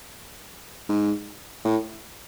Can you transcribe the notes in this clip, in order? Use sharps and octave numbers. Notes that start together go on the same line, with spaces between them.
G#2
A2